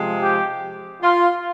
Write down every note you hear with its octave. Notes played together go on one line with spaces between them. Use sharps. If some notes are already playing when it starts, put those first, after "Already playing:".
Already playing: C3 F3 G#3
G4
F4